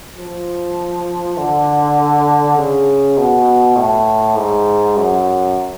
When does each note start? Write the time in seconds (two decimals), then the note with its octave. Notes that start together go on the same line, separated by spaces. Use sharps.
0.18 F3
1.38 D3
2.57 C#3
3.18 B2
3.77 A2
4.36 G#2
4.97 F#2